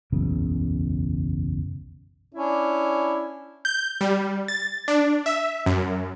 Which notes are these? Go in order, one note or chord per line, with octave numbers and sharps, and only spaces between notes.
F#1 B1 E2 C#3
C#4 D4 E4
G6
G3
A6
D4
E5
F#2